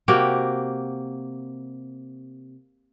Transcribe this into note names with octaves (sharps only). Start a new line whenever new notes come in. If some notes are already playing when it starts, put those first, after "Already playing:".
C3 A#3 F#4 G4